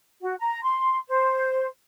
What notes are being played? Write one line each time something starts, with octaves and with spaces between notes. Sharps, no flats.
F#4
A#5
C6
C5